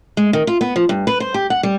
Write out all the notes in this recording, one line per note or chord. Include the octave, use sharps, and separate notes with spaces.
G#3
D#3
F4
B3
F3
G2
B4
C5
G4
F#5
G3